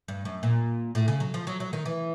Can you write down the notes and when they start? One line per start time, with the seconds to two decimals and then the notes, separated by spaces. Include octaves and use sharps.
0.08 G2
0.25 F#2
0.43 A#2
0.95 A2
1.08 C#3
1.20 F#3
1.34 F3
1.47 F#3
1.60 F#3
1.73 D#3
1.85 E3